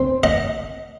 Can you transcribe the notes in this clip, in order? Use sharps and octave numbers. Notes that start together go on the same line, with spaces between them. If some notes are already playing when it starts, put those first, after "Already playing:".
Already playing: C4
D#5